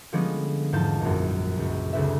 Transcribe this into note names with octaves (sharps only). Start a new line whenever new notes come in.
D3 F3 G3 G#3 B3 C#4
E2 G#2 F3 D#4 A5 G6
A#1 F#2
C#2 F#2
D2 C#3 C4 B4 E5